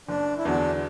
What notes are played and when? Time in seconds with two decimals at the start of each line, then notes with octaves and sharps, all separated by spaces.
0.09 F#1 D4
0.38 E4
0.45 E2 D3 F#3 D4